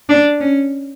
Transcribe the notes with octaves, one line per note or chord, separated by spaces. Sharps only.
D4
C#4